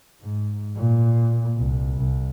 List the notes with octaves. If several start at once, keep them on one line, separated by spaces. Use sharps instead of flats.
G#2
A#2
C2
C2